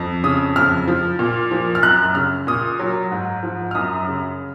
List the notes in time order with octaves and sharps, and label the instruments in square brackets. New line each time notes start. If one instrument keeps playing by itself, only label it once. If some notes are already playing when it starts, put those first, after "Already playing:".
Already playing: [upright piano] F2
C#3 D#6
F2 F6
F3
A#2
F3
F6
F#2 F#6
C#3 F6
A#2 D#6
F#3
G#2
F3
F6
F#2 D#6
C#3